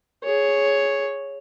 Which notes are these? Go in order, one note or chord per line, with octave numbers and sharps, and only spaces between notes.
G#4 C#5